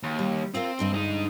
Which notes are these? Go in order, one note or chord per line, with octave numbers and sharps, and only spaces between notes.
D#2
G3
C4 F4 A#4 F5
D2 G2 D#5
G#3 D#4